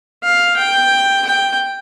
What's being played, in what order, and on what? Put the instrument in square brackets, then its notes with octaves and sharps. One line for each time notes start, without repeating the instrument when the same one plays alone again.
[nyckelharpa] F5
G5
G5